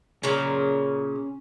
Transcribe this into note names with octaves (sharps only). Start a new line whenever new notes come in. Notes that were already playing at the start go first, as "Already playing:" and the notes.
A#2 C#3 C#4 A#5